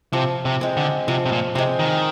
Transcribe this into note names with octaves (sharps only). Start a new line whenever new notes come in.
C3 F3
C3
G#3 C4
D3
C3 F3
C3
A#2
C3 G#3 C4
D#3